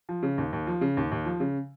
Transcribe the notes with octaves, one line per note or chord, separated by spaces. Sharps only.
F3
C#3
D#2
D#2
F3
C#3
D#2
D#2
F3
C#3